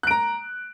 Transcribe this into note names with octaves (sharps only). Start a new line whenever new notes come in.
A#5 F#6 D7